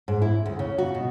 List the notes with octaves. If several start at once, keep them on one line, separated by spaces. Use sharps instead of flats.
G#2
E4
D2
C#3
F#4
B2